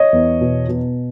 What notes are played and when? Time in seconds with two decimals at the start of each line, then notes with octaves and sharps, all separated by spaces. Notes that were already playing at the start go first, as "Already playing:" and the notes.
Already playing: C#5 D#5
0.13 E2
0.41 B2
0.69 B2